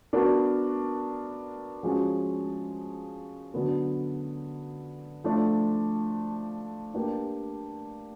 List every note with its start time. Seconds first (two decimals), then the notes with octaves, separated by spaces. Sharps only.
0.13 B3 D4 F#4 A#4
1.83 F3 G#3 C#4 F#4
3.54 D3 F#3 B3
5.24 F3 A3 D4
6.94 A#3 D4 G4 B4